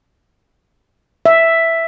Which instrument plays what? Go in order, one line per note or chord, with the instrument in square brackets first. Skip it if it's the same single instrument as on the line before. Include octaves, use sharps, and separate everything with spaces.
[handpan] E5